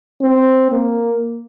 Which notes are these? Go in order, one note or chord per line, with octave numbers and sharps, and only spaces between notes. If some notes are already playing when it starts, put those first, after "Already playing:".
C4
A#3